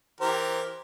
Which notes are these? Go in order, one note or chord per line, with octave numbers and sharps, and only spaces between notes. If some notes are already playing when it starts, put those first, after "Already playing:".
E3 G4 A#4 C5